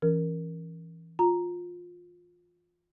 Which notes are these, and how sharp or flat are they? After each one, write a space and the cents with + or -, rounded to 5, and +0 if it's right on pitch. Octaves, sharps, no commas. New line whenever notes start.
E3 +0 C#4 +0 A#4 +0
F4 +15 A#5 +0